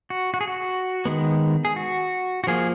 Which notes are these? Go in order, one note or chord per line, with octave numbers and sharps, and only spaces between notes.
F#4
F#4
G#4
F#4
D#3 G#3 B3
G#4
F#4
F#4
F3 A#3 G#4